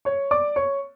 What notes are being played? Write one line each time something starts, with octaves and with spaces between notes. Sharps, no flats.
C#5 C#6
D5 D6
C#5 C#6